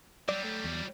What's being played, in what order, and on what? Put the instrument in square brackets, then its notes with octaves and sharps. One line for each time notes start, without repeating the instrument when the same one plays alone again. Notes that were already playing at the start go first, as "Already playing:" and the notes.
[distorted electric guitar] F#3 G3 [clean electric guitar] D5
[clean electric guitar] A3
E2